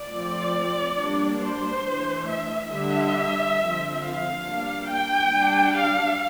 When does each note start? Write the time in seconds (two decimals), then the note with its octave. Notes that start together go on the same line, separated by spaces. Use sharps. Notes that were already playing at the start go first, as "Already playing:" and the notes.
Already playing: D5
0.12 F3 A3 C4
0.98 G3 A#3 D4
1.42 C5
1.85 E3 A3 D4
2.29 E5
2.72 D3 G3 D4 E5
3.59 D3 F3 C4
4.02 F5
4.45 G3 A#3 D4
4.88 G5
5.31 G3 D4
5.74 F5